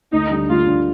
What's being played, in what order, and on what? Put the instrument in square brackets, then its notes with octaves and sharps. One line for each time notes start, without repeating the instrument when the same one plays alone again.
[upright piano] D2 [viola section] D#4
[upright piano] D3 G3 D4
[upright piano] D2 [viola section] F4
[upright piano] D3 G3 D4